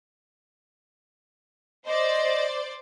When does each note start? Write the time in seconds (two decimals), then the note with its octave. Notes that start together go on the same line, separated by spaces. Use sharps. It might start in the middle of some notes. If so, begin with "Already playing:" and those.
1.86 C5 D5 D#5